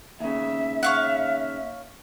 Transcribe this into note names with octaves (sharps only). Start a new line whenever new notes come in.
D#2 C#3 E5
C#5 F5 F#5